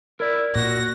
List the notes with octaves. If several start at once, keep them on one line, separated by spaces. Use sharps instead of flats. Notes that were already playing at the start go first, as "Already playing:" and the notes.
E4 A#4 D5
A#2 F#4 A#6